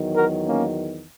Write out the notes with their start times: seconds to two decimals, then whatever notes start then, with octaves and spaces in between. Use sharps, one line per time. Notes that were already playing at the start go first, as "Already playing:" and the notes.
Already playing: E2 D#3 F#3
0.16 F#4 A#4
0.46 A#3 C#4